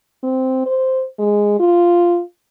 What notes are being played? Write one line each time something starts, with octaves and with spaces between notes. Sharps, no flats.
C4
C5
G#3
F4